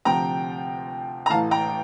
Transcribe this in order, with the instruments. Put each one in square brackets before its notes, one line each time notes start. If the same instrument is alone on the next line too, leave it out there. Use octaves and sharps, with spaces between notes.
[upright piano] D2 C3 F3 G5 A#5
A#5
A1 A2 E3 F5 A5
G5 A#5